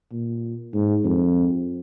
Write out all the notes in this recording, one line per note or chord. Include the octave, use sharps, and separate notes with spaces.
A#2
G#2
F2